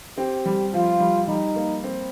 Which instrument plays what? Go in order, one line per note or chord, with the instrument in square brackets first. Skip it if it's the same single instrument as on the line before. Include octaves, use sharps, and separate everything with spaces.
[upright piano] C4 [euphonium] G4
[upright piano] G3
[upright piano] F3 [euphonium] F4
[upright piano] G3
[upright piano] G3 [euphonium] D#4
[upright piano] A#3
C4